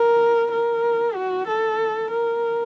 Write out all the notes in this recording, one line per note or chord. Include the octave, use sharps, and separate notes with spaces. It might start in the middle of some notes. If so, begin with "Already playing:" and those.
Already playing: A#4
A#4
F#4
A4
A#4